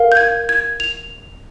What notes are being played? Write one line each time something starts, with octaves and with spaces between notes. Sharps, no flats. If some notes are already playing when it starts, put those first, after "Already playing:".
Already playing: A#4 F5
G6
G#6
G#6
F7